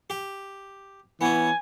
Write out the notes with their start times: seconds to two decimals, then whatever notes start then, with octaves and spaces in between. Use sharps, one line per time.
0.10 G4
1.21 E3 B3 C#4 G#5